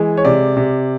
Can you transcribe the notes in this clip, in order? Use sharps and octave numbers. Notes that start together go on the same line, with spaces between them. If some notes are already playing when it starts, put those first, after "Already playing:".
Already playing: E3 G#3
C#5
C3 D5
C3